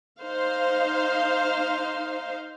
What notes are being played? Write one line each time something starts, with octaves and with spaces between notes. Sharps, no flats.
D#4 C5 F5